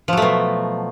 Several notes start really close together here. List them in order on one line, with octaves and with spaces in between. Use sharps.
F3 F#3 A3 B2